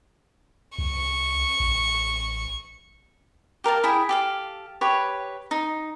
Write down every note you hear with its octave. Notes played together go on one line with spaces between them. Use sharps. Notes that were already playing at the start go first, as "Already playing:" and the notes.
C2 C#6
A1
G4 A#4 F5 A5
E4 G#4 G5
G4 A4 F5
G4 B4 C#5
D#4